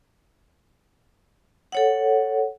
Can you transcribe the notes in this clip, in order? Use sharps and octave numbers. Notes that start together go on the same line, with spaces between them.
A4 C#5 F#5